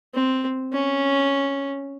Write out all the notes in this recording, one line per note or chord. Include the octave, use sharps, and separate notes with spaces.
C4
C#4